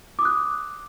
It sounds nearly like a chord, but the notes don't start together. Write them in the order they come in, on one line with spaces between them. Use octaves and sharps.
D6 D#6 F#6